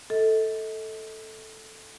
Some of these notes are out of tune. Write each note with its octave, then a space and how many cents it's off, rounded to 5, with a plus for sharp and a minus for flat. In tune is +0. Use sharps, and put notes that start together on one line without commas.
A4 +0 D#5 +45